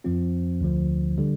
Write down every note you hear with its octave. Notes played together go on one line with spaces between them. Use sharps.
F2 F3 C4 F4
D2 D3 F3
D3 G3